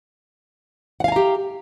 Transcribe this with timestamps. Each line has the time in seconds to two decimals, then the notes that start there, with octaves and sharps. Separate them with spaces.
1.00 F#5
1.04 F5
1.08 G#5
1.12 A#5
1.16 G4